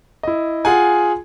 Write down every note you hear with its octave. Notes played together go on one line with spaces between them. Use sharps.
E4 D#5
F4 G#4 F#5 G#5